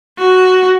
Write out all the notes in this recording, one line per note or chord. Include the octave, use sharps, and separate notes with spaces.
F#4